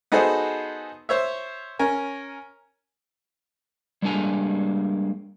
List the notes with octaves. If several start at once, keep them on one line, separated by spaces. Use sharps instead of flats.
B3 D#4 F#4 G#4 A4 C5
C5 C#5 E5
C#4 A#4 G#5
G3 G#3 A#3 D4 G#5 A#5